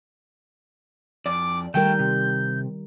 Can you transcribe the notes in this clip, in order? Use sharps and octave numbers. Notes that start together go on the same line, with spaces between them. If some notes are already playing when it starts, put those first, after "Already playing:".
F2 D5 D6
D#3 G3 A3 A#4 G5 G6
C3